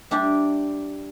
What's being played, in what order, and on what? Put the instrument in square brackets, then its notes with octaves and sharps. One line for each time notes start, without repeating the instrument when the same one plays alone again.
[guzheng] G3 D4 E4 G4 D5